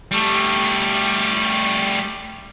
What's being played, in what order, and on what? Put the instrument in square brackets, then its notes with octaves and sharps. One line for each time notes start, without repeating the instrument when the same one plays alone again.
[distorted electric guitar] G3 A3